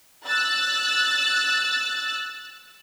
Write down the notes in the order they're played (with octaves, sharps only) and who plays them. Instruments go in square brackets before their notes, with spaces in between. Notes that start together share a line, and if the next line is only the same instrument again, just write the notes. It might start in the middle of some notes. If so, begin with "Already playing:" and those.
[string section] E6 F#6 A6